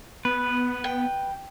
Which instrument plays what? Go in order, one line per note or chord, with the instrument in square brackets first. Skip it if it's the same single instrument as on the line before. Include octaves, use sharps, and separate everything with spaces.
[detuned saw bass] B3 [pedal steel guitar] B4
[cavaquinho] G5